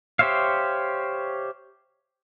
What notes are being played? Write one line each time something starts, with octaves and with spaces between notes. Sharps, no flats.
G4 C5 C#5 E5 F5